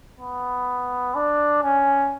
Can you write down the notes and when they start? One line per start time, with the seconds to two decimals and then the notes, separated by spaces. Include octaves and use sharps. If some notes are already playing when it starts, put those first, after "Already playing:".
0.19 B3
1.15 D4
1.63 C#4